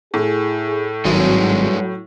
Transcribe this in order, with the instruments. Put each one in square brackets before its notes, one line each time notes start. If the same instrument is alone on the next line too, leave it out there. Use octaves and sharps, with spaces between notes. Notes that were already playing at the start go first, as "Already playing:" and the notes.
[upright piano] A2 [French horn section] G#4
[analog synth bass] G#1 [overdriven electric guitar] G2 G#3 [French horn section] F#3